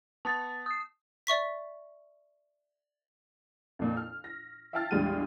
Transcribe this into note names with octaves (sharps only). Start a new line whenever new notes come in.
B3 A5 D#6 A6
D#6 C7
D5 E5 C#6 B6
F2 A#2
F6
A#6
E5 F5 G5 A5 F6 A6
A#1 E2 G3 G#3 G5 D#7